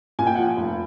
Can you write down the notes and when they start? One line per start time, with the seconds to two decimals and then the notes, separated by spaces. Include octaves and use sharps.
0.19 A#2 G#5
0.27 G5
0.35 F3 F#5
0.44 G5
0.57 F1